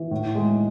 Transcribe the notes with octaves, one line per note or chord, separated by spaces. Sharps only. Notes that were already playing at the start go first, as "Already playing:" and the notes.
Already playing: E3
A2
G#3